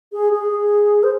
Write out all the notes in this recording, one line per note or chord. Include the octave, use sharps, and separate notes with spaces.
G#4
G#4
C5